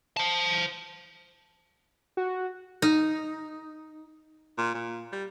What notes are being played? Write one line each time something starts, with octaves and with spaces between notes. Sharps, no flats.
C5 A5
F#4
D#4
A#2
A#2
G3